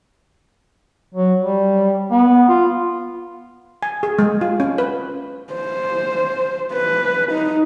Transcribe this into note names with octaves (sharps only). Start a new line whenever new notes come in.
F#3
G3
B3
F4
G#5
G#4
G#3
F4
C#4
B4
C5
B4
D#4